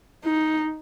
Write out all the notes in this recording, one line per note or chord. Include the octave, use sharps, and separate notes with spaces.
D#4